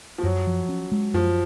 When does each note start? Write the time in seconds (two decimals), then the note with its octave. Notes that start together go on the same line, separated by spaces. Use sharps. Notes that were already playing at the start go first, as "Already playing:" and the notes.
0.18 F3
0.23 F#2 F#3
0.47 F3
0.69 C#4
0.92 G#3
1.14 F#2 F3